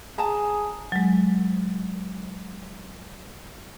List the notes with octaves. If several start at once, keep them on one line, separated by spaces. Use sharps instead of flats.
G#4 A5 A#5
F#3 G#3